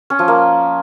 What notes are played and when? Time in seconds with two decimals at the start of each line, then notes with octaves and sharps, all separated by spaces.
0.10 C#4
0.19 F3
0.28 A#3